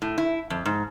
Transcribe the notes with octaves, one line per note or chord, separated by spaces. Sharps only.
A2
E4
F2
G#2